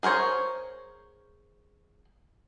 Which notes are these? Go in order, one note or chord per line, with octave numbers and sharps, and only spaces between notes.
G#4 A#4 C5 C#5